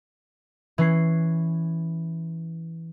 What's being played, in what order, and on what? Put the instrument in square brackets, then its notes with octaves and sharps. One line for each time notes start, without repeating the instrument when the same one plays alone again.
[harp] E3 C#4 C7